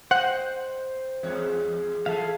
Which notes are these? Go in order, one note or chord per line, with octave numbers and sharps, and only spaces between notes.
C5 D#5 F#5 G5
E2 G#3 C#5
E3 G#4 A4 E5 F5